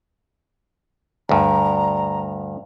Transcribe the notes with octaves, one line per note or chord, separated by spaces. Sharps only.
D2 G2 A#5